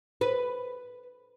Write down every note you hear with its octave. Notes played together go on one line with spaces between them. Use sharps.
B4